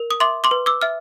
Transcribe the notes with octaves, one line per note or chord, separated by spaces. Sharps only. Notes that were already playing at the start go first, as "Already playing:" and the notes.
Already playing: A#4
D#6
E5 C6 D6
C6 D6
B4
D6 E6
E5 F6